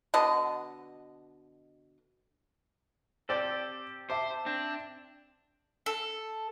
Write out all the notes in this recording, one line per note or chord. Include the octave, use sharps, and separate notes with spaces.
B2 D3 D#5
C4 G4 A4 C5 D5
C5 E5 A5 D6
C4 D4
A4